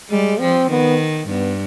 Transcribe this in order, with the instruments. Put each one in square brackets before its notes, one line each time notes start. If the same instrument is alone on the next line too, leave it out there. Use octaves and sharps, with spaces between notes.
[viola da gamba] G3 [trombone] G#3
[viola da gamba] F3 [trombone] C4
[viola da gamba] D#3 [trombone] B3
[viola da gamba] G2 [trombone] B3